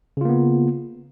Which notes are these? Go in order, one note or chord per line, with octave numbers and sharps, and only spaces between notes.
C#3 A#3 B3 F4